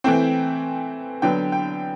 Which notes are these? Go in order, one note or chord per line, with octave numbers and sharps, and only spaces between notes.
E3 A3 C4 G5
D3 F#3 B3 G5
G5